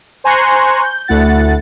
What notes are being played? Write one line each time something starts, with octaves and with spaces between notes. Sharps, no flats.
C5 G#5 A#5 C6 C#6 F#6
G6
D2 A3 E4 F#5 A6